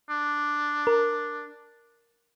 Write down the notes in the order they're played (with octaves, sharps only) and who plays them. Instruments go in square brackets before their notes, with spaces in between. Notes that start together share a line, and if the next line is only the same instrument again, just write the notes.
[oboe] D4
[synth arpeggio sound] A#4